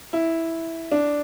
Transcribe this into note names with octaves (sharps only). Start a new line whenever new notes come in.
E4
D4